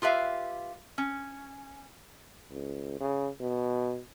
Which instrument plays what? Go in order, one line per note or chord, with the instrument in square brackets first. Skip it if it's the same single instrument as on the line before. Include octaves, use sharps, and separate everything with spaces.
[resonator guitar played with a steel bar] F4 G4 B4 E5 F5
C#4
[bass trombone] C#2
C#3
B2